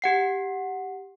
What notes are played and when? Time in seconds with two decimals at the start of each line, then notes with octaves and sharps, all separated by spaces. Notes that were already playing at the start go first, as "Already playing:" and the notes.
0.02 G4 F#5 C7